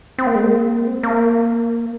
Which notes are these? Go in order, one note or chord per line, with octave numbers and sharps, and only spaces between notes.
C4
A#3
G#3
A#3
C4
A#3